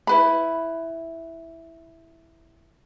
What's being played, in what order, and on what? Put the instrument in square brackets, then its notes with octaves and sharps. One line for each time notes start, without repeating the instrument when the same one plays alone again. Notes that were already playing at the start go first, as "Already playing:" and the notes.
[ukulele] E4 B4 B5